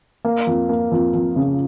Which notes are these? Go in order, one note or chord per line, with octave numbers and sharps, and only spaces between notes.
A#3
F2
A#3
F2
F2
C#3